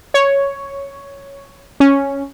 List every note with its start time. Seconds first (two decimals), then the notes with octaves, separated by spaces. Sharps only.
0.14 C#5
1.80 C#4